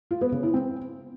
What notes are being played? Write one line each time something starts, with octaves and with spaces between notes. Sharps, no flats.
F4
B3
C#3
E4
C4